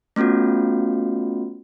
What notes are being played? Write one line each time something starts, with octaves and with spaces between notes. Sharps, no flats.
A3 B3 C#4 F4 F#4